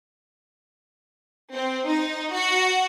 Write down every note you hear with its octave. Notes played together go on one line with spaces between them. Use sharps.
C4
D#4
F#4